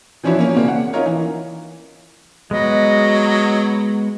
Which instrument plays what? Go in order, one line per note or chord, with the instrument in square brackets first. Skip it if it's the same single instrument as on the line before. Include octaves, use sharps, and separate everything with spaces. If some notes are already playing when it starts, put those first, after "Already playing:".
[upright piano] E3 F3 C#4 D4 E4 F#4
A#3 C#4
C#3 A#3 C4 D4
F#5
C#4 D#4 F4 A#4 C#5
E3
[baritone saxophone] F#3 [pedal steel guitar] G#3 B3 B4 [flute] D#5